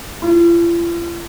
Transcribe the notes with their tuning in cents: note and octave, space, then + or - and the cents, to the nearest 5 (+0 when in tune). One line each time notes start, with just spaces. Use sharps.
F4 -45